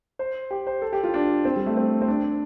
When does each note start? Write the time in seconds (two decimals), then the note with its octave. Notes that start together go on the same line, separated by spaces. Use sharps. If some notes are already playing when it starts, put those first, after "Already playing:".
0.19 C5
0.51 G4
0.67 C5
0.82 A4
0.93 G4
1.03 F4
1.14 D4
1.45 C4
1.56 G3
1.66 A3
1.77 C4
2.01 C4
2.08 D4